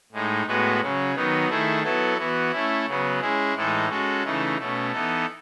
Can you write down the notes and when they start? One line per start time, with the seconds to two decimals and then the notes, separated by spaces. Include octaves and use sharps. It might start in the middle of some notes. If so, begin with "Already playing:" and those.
0.12 A2 G#3 D#4
0.46 A2 G#3 B3 F#4 B4
0.81 C#3 F#3 C#4
1.15 D#3 F#3 B3 D#4
1.49 D#3 A3 E4 G#4
1.83 F#3 B3 E4 A4
2.17 E3 B3 F#4
2.52 A3 C#4 E4
2.86 C#3 F#3 B3
3.21 G#3 C#4 E4 G#4
3.55 A2 E3 G#3 D#4 A4
3.89 G#3 C#4 F#4 A4
4.23 C#3 E3 A3 D#4
4.57 B2 A3 C#4
4.92 E3 B3 D#4 A4